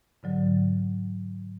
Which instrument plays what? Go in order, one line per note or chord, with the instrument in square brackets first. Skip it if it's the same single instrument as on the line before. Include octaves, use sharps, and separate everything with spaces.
[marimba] G#2 D3 F#3